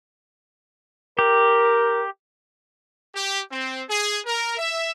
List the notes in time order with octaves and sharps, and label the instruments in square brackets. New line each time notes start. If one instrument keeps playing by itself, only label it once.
[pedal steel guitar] G4 [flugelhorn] A#4
[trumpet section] G4
C4
G#4
A#4
E5